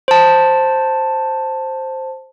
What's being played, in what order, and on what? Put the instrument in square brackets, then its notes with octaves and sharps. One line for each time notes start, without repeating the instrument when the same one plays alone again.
[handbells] C5 A5